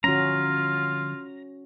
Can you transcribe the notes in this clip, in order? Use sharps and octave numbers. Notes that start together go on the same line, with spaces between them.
D3 F3 G3 C#4 F4 F#4 A#5